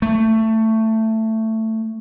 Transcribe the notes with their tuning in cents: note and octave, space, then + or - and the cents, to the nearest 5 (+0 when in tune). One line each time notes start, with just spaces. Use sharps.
A3 +15